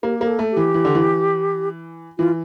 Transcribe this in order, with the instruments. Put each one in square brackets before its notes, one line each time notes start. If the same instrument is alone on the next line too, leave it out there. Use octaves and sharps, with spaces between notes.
[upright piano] A#3 [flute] G4
[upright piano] A#3 [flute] G4
[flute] A4
[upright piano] A3
[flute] G4
[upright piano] E3
E3
D3
E3
[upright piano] E3 [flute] F4